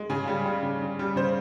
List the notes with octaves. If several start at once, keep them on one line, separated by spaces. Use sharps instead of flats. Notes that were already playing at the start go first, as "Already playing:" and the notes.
Already playing: G#3
C#3 G#4 G#5
G3
G3
C#3
C#3
G3
C#3 C5